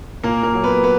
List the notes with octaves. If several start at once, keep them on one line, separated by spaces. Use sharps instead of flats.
A#2 A#3 A#4
A#3 A#4
F#3
B3 B4
B3 B4